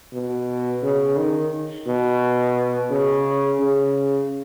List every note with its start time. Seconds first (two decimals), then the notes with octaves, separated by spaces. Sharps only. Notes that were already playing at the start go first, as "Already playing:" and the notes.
0.13 B2
0.83 C#3
1.17 D#3
1.87 B2
2.91 C#3
3.60 C#3